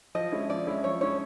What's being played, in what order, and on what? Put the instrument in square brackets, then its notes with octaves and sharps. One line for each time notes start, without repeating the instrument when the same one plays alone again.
[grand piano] F3 [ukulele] D#5
[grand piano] G#3 C#4 E4
[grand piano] F3 [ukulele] D5
[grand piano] G#3 C#4 E4
[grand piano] F3 [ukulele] C#5
[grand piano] G#3 C#4 E4 [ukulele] C#5